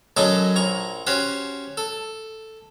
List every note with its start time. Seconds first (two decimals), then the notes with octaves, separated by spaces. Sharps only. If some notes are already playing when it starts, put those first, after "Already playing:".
0.17 F#2 F#3 A4 D#5 C#6 D6
0.56 A#1 A#5 C#6
1.07 C#4 F#4 G4 C5
1.77 A4